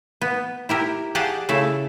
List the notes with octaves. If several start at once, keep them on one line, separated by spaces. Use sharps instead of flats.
B3
E4 G4 A#4
G4 G#4 D5 F5 F#5 A5
C#3 A3 E4 A4